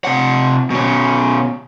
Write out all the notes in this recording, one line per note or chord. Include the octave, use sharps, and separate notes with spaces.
C3 F#5
B2 C#4